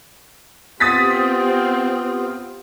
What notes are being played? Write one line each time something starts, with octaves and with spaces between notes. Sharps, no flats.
B3 C4 F4 G4 D#6 A6 B6